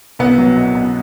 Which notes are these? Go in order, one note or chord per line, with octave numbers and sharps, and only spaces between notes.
C2 B3
F#3
B2
B2